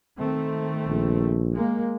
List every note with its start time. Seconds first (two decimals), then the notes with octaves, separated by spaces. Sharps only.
0.19 D#3 A3 C4
0.88 A#1
1.53 G#3 A#3